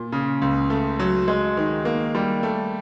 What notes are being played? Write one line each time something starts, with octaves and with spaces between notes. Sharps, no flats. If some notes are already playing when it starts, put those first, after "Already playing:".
Already playing: A#2
C#3
C#2
A3
F#3
G#3
D#3
A#3
G3
A3